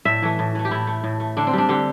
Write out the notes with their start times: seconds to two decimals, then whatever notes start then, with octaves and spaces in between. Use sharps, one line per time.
0.05 A2 E5
0.22 E3 A3
0.39 A2
0.55 E3 A3
0.65 G4
0.71 A2 E4
0.87 A3
1.04 A2
1.20 A3
1.37 D3 D4
1.47 C4
1.53 G3 D4
1.69 D3 G4